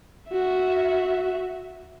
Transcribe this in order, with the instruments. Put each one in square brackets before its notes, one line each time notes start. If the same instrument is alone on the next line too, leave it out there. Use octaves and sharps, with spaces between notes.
[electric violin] F#4 E5